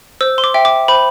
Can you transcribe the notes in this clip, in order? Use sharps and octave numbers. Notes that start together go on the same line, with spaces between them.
C5 E6
C6
D6
E5 G5
D6
C5 B5